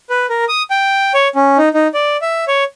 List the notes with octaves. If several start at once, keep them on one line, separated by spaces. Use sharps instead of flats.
B4
A#4
D#6
G5
C#5
C#4
D#4
D#4
D5
E5
C#5